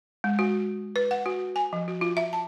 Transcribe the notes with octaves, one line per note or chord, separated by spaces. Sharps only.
G#3
F#4
B4
F#5
F#4
G#5
F3
F#4
F4
E5
A5